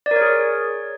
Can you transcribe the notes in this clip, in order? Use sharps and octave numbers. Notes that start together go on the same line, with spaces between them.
D5
A#4
C#5
G#4
C#5